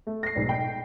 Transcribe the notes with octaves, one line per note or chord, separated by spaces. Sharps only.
A3
A#6 C7
B1 G#2 D5
G5